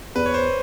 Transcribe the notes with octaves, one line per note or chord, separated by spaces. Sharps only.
E2 B4
C#5
C5